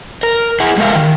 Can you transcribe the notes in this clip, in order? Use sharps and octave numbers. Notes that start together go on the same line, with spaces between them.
A#4
E4 G#4 F#5
G#3 G4 A4 A#4 E5 F5
D#3